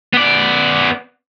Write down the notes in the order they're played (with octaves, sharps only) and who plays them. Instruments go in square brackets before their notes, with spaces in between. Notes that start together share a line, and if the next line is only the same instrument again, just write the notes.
[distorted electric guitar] B3 D5